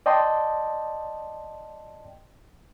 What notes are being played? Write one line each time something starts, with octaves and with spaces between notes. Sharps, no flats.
D5 D#5 G5 A5 C6